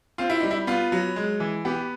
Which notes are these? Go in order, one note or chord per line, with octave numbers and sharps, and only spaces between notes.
C4 F4
E4
G3 D#4
E4
B3 F4
F#3
G#3
E3
B3 G4